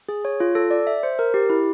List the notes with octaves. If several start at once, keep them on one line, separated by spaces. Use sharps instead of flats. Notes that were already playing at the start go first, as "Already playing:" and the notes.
G#4
C#5
F4
A4
D5
E5
C5
A#4
G4
E4